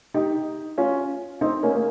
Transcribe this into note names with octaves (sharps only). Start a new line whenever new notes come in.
D#4 G4
C#4 F4
C4 D#4
A#3 C#4
A#3